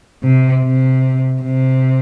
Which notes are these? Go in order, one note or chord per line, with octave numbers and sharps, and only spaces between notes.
C3
C3
C3